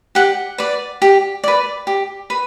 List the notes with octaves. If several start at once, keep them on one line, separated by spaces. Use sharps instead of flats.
G4 F#5
B4 D5
G4
B4 D5
G4
B4